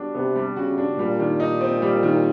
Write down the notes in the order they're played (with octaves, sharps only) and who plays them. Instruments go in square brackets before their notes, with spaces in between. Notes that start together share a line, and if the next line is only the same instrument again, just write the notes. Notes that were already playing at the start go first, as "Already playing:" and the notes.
Already playing: [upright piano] G3 B3 D4 F#4
[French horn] C3 [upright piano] B3
[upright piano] G3
[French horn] C#3 [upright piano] F#4
[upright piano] D4
[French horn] A#2 [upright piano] G3
[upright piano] D#3
D#4
C4
G3
D#3